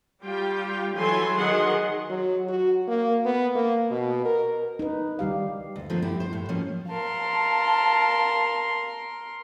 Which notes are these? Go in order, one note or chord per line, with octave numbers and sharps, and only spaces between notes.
G3 F4 G4 G5
E3 F#3 A4 G#5 C6
D#3 F#3 G#4 D#5 F#5 C6
F#3
F#4
A#3
B3
A#3
B2
A#4
D#4 B4
D#3 G3 G4 F5
D2
D3 F3 A3 A#3 C4
B3 E4 G4
C5
A2
F3 F#3 A#3 C#4
A#4 F5 A5 C6